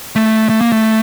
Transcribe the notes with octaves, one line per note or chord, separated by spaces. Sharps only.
A3
A3
A#3
A3